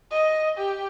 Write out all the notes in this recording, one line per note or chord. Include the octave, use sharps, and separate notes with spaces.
D#5
G4